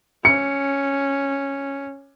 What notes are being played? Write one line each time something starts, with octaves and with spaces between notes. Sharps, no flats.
C#4 C#7